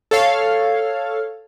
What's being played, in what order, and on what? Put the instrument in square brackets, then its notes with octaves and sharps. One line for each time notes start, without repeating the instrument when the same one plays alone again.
[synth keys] A4 C#5 F5